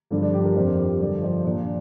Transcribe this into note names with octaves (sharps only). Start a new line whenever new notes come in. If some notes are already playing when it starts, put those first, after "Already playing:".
G2 D3 F3 D4
D4
G4
A#4
F2 F3 C5
A#4
G4
G2 D3 F3 D5
C5
A#2 F3 D4